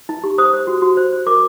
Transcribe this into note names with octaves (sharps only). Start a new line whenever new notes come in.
D#4
G4
C5 D#6
C5
F#4
F#4
C5
C5
A#4 D6